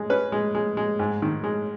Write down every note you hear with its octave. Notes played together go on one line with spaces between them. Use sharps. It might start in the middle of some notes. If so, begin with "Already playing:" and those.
Already playing: G#3
C#4 B4
G#3
G#3
G#3
G#2
D#3
G#3